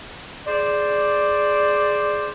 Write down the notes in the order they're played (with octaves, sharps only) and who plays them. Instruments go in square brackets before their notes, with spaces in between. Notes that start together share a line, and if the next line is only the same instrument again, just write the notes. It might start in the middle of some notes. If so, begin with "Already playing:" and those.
[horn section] G#4 C5 D5